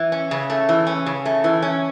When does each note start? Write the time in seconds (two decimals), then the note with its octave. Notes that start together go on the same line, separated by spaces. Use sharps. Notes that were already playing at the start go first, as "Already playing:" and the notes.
Already playing: E3
0.12 C#4
0.31 C#3
0.50 A3
0.69 E3
0.87 C#4
1.06 C#3
1.25 A3
1.44 E3
1.62 C#4